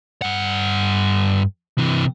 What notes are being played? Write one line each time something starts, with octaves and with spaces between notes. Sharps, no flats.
G2 F#5
C3 E3